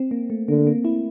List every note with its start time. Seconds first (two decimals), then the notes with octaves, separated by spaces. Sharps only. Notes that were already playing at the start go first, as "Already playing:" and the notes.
Already playing: C4
0.11 A#3
0.30 A3
0.48 D3 A#3
0.67 A#3
0.85 E4